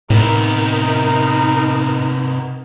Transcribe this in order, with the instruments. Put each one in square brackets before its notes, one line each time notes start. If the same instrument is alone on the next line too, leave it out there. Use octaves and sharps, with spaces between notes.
[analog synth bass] A2 [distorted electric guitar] C3 B3 [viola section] D#4 A#4